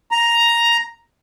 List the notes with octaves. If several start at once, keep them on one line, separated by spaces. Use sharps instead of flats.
A#5